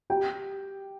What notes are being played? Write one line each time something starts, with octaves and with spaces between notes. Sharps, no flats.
G4 G5